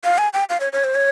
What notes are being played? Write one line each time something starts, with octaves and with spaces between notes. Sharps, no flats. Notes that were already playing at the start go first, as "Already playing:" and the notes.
F5
G#5
G5
F5
C#5
C#5
C5
C#5